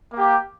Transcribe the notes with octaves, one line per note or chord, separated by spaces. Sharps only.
A#3 G4